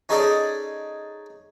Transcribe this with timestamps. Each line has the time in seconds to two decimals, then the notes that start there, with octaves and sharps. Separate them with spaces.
0.09 C#4 D#4 G#4 A4 D5 D#5